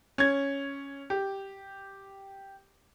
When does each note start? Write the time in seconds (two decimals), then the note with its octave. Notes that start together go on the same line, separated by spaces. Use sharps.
0.18 C#4 G#6
1.10 G4